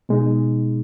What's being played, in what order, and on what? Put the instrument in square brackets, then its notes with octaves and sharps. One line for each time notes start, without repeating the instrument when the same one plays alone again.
[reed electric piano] B2 G#3 D#4